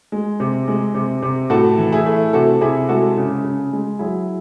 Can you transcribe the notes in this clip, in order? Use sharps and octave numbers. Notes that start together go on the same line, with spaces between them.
G#3
C3
G#3
C3
C3
A2 F#4 A4
E3
E4 G#4
A3
C3 F#4 A4
C3 E4 G#4
G#3 F#4 A4
C#3
C#3
G#3
F#3 E4 G#4